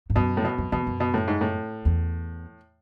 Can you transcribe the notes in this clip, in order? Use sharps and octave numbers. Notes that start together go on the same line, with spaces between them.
G#2
F#2 B2
A2
B2
F#2
E2 B2
F#2
B2
A2
G#2
A2
E2